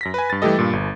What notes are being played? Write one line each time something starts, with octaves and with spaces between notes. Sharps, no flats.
F#2 A#6 B6
B4 G#5
G2 A6
E3 G3 A3 G4 A4 D#5
G2 A#2
G1